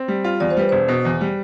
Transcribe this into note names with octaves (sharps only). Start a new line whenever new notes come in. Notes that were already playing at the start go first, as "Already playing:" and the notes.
Already playing: C4
G3
F4
E2 D5
C5
G3 B4
E1 C5
B2
E2
G3